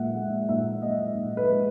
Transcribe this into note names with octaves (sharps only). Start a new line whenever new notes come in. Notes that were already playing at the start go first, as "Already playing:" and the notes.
Already playing: A#2 G#3 E5 F#5
G#3
A#2 E5
G#3 D#5
A#2
B4
G#3